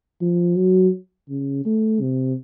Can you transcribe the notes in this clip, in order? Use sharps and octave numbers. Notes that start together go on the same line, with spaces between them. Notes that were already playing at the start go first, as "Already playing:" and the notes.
F3
F#3
C#3
A3
C3